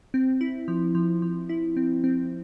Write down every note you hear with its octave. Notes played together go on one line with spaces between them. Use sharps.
C4
E4
F3
F3
F3
E4
C4
C4